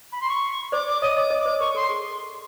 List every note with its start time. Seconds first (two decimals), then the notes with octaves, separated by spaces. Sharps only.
0.12 B5
0.20 C6
0.28 C#6
0.72 C5 D5 D6
0.87 D6
1.01 C#5 D#5 D#6
1.16 C#5 D#5 D6
1.30 C#5 D#5
1.38 D6
1.45 C5 D5
1.60 A#4 C#6
1.74 A4 C6
1.89 G#4